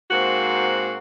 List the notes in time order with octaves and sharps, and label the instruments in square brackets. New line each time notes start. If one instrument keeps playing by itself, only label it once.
[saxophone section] G#2 A#3 C4 F#4